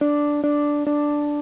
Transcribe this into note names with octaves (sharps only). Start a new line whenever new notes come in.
D4
D4
D4